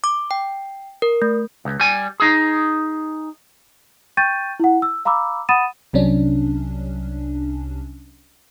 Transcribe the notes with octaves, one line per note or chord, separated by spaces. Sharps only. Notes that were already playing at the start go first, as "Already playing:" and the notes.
D6
G5
A#4
A3
C#2
G3 G#5
D#4 G#4
G5 C#6 G6 A6 D#7
E4 F#5
E6
F5 A#5 B5 D6 E6
F#5 B5 D#6 A6 D#7 E7
C2 C3 F#3 C#4 D4